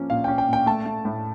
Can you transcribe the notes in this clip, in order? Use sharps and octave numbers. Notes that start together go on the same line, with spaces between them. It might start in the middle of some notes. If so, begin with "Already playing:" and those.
Already playing: F3 A#3 C#4
A#2 F5
C#4 G5
G5
A#2
G5
A3 A5
A3
A2